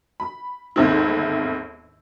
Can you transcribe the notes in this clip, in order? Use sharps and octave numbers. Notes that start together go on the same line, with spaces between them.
B5
G1 D#2 G#2 C4 E4